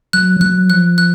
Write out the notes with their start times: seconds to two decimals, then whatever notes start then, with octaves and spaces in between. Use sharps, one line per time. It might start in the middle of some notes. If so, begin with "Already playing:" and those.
0.13 F#3 F#6
0.37 F3
0.41 F#3 F#6
0.70 F3 F#6
0.98 F#6